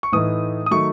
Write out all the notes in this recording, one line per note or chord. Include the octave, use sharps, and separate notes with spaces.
C#6
A2 E3 A3 D#4 D#6
D#6
D#3 F#3 A3 C#6